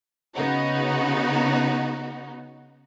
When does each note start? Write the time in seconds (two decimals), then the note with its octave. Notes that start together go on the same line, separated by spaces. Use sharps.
0.35 C#3 B3 D#4 F#4